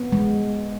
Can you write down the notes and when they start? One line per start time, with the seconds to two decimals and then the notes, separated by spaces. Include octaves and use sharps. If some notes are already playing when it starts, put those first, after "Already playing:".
Already playing: B3
0.12 G#3